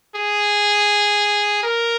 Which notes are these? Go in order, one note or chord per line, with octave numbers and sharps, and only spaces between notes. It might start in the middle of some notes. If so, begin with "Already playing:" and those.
G#4
A#4